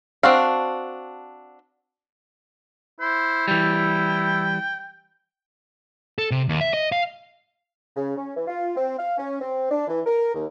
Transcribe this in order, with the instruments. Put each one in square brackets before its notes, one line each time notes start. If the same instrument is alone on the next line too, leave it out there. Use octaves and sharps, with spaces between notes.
[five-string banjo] C4 D4 F#4 F5
[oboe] E4 [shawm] C5
[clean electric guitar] E3 G3 [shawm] G5
[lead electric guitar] A4
C3
D#2
E5
D#5
F5
[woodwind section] C#3
C#4
E3
F4
C4
F5
C#4
C4
D4
E3
A#4
D#2